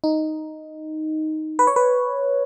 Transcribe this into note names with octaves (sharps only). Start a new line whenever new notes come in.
D#4
B4
C#5
B4